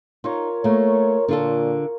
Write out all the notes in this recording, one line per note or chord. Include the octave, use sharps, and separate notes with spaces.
D#4 F4 A#4 C#5
A3 A#3 A#4 C#5
A#2 D3 F4 A4